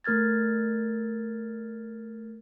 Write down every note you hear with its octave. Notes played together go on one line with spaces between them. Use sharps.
A3 A#4 F6 G#6 A6